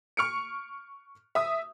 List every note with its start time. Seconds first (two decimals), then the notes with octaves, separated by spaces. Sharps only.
0.17 C#6 F6 C#7 D7
1.35 E5 D#6